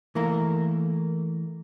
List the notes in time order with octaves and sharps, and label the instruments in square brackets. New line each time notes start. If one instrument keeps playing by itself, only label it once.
[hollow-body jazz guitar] E3 A3 A#3 A#4